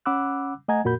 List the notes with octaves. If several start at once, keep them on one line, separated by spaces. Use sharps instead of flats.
C#4 F#5 B5 D6 E6 F#6
A3 D#5 F#5 G#5 A#5 G#6
F2 A#2 F#4 A#4 B5 G6